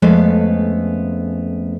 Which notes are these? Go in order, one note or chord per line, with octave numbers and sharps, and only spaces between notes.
F2 G#3 A3 B3 C#4 F5